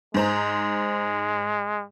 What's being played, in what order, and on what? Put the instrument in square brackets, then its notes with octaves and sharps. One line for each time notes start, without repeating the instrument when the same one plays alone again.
[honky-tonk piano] G#2 C5 A#5 [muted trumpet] G#3